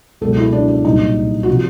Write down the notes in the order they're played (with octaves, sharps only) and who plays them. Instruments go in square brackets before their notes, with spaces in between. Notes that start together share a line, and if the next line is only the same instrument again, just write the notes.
[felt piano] C#2 B2 F#3 A4
E4
D4
D4
C2 A#2 F#3 D#4
F#4
C3 F3 F4